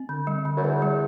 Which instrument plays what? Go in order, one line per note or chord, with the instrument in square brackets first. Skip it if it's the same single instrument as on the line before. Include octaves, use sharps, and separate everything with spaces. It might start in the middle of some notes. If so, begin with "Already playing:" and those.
Already playing: [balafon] C4
D3
G3
D3
[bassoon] F#2
[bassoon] E2 [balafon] D3
[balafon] G3